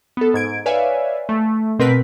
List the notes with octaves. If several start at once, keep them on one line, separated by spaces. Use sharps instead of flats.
B3 A4
G#2 G#6 D7
B4 C#5 D5 E5 F5 G#5
A3
B2 C4 A#4 B4 B6